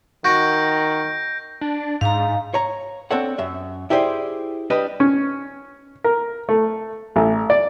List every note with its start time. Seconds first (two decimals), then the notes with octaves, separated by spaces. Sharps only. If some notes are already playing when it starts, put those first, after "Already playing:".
0.25 D#3 F#4 G6 A#6 D7
1.61 D4
2.01 G#2 F5 A#5
2.54 C#5 A#5
3.11 C4 D4 A4 C#5 F#5
3.38 F#2 E5
3.90 E4 G4 G#4 C5 D5
4.70 G3 D4 B4 D#5
5.00 C#4
6.04 A#4
6.49 A3
7.16 A1
7.50 D5